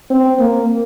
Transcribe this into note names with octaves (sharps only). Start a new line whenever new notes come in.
C4
A#3